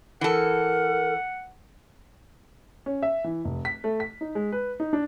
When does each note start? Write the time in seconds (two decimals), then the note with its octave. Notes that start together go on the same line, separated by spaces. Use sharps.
0.21 E3 A4 A#4 F#5
2.86 C#4
3.03 E5
3.24 E3
3.45 F1
3.65 B6
3.84 A3
4.00 B6
4.21 D#4
4.35 G#3
4.52 B4
4.80 D#4
4.93 D4